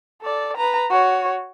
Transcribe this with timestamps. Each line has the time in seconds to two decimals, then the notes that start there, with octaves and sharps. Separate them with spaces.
0.22 A4 D5
0.57 B4 A#5
0.90 F#4 C#5